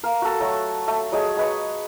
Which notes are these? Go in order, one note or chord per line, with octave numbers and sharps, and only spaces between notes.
A#4 F5
F#4 A4
F#3 A3
A3
F#3 G#3 G#4
G#3 B4 C#6